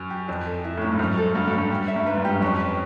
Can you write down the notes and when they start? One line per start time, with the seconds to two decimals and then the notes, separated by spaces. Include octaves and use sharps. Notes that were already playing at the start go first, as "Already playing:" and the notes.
Already playing: F#2
0.10 G4
0.28 F2 C5
0.46 A4
0.64 E4
0.77 A2
0.81 G#2 C#4
0.92 G2
0.99 F#2 C5
1.17 A4
1.34 G2 F#4
1.48 G2
1.52 C#4
1.58 G2
1.71 G4
1.88 E5
1.96 G2
2.06 G#2 B4
2.18 G2
2.25 G4
2.30 F#2
2.42 F2 C#4
2.60 B4